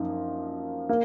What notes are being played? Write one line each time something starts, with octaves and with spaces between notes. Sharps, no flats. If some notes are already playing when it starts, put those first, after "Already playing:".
Already playing: F#2 F3 A#3 D#4
A#3